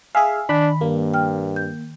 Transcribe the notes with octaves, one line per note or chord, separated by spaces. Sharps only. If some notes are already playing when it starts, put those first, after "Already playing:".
G#4 E5 F5 G#5
D#3 D4 B5
G2 A#3
G5 F6
G6